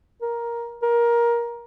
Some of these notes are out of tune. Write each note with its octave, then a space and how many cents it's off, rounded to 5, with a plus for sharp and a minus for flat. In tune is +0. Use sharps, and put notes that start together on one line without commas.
A#4 +10
A#4 +15